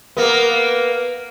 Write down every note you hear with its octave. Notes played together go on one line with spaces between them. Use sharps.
A#3 B3